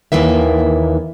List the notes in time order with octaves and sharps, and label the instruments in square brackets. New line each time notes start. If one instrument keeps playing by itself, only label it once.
[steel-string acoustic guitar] D#2 D#3 E3 A#3 E5